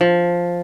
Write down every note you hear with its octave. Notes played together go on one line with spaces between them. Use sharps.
F3